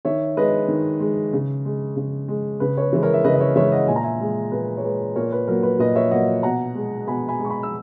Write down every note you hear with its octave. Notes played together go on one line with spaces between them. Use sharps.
D#3 C#5 E5
G#3 B4 D#5
D#3
G#3
C#3
G#3
C#3
G#3
C#3 B4
C#5
B4
E3 G#3
A#4 C#5
E5
C#3 B4 D#5
D#5
C#5 E5
E3 G#3 C#5 E5
D#5 F#5
A#2 G#5
A#5
E5 G#5
G#3
A#2 B4
C#5
G#3 B4
A#2 A#4 C#5
B4
F#3 A#3 A#4
B4
A#2 B4 D#5
C#5 E5
F#3 A#3 D#5 F#5
B2 F#5 A#5
G#3
B2 G#5 B5
G#5 B5
G#3
C#6
G#5 B5
E6